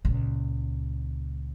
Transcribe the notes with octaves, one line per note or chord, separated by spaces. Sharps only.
C#2 A#2